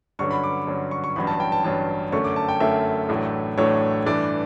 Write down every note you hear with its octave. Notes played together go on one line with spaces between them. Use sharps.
G2 D3 F#3 C#4 C#6
B5
D6
G2 D3 F#3 C#4
C#6
C#6
A1 G2 F#3 C#4 B5
A5
G5
A5
A1 G2 F#3 C#4 A5
F#2 D3 A3 C#4 C#6
D6
A5
G5
F#2 D3 A3 C#4 E5
A1 A2 F#3 A3 D4
A1 A2 F#3 A3 D4 C#5
G2 E3 A3 D4 D5